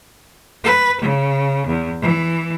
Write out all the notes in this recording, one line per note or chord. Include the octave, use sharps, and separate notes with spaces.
B4
C#3
E2
E3